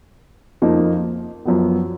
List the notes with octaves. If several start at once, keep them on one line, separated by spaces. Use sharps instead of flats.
F2 F3 A#3 D#4
F#2 F3 B3